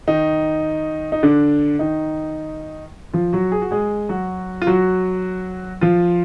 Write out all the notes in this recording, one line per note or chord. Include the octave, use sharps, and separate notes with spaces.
D#3 D#4
D#4
D3 D4
D#3 D#4
F3 F4
F#3 F#4
G#4
F#4
G#3 G#4
F#3 F#4
F4
F#3 F#4
F3 F4